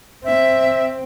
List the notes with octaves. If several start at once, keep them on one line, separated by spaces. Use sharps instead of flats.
C4 E5